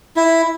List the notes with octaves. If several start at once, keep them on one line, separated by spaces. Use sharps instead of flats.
E4